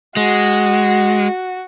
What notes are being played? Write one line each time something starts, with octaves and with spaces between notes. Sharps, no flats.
G#3 F#4